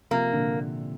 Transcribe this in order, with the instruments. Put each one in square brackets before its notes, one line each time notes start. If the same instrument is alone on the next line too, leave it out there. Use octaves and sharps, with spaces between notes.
[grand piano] C3 F3 [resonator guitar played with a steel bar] A#3
[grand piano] A#2 D3